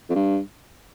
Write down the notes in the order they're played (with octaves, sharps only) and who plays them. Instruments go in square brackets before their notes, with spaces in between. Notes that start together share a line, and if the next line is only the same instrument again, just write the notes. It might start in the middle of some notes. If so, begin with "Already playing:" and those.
[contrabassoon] F2
G2